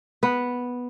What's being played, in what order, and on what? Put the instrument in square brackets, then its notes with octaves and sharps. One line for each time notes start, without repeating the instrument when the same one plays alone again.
[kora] B3